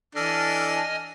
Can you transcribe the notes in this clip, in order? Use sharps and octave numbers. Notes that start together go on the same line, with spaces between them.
E3 D4 A4 D#5 G#5 F6